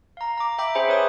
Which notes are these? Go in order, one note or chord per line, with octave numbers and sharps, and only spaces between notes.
F5 A#5
A#5 D6
E5 G5 B5 D6
C#4 G#4 C5 E5 G#5 B5
B4 C#5 D#6